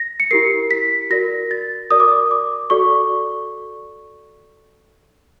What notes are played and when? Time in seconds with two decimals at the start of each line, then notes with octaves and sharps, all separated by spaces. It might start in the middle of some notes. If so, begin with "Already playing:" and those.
Already playing: A#6
0.20 C#7
0.31 E4 G4 A#4 C7
0.71 B6
1.10 F#4 A#4 D5 A#6
1.51 A6
1.91 F#4 A#4 D5 D#6
2.00 D6
2.09 D#6
2.31 D6
2.70 F#4 A4 D5 C#6